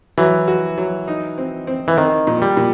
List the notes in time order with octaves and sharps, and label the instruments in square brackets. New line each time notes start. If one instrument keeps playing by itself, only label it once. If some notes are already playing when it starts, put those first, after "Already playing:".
[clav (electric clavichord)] E3 [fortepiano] F#3
[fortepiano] F#4
F#3
D#4
C4
C4
[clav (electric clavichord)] E3
[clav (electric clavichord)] D#3 [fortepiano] C4
[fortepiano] A#2
[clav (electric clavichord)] G3
[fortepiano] A#2